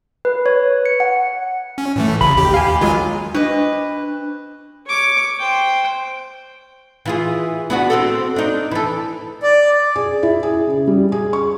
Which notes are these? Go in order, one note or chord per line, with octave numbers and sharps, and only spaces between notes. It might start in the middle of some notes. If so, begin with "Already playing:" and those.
B4
C#5
C#7
F#5
C#4
A2 E3 A3
A1 C#3 B5
D#2 G4
F5 G#5
D#3 F#3 G#3 F4 G#5
D4 B4 D#5
C#5 D6
C5 G5
E3 F4 G#4
B3 D4 F#4
C4 F#4 A4
D4 D#4
E3 A4
D5
G#4
E4
G#4
C#3
G3
G#4
C#6